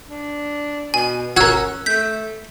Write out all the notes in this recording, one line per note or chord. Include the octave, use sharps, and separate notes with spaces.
D4
B2 G#5
C#4 F#4 A#4 E6 F#6 G#6
A3 G6 B6